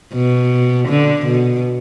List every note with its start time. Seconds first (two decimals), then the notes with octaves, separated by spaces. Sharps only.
0.13 B2
0.88 D3
1.26 B2